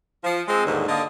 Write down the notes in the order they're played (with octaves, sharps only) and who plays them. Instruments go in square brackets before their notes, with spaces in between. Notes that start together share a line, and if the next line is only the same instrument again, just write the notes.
[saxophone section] F3
G#3 C4
D#2 G#2 D3 G3
D3 A#3 D#5